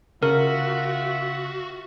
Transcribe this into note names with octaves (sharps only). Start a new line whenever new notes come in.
C#3 F4 F#4 A#4 E5